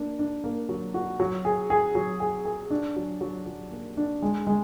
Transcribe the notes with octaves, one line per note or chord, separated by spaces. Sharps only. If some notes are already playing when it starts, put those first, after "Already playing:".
Already playing: A#3 D4
D4
A#3
F#3
F#4
F#3
G#4
G#4
F#3
G#4
G#4
D4
F#3
F#3
F#3
A#3
D4
G#3
G#3